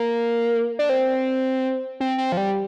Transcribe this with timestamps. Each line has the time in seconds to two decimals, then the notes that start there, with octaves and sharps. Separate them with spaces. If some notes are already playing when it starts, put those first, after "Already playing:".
Already playing: A#3
0.79 D4
0.89 C4
2.00 C4
2.18 C4
2.32 F3
2.37 G3